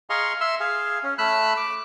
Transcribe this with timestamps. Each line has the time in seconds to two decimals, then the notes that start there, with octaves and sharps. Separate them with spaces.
0.10 G#4 D#5 F5 A#5 C6 C#6
0.41 E5 C6 E6
0.60 G#4 F5
1.03 C#4
1.18 A3 B5 E6 F#6
1.57 D6